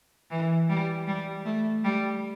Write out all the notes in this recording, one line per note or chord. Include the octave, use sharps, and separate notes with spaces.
E3
G3
G3
A3
G3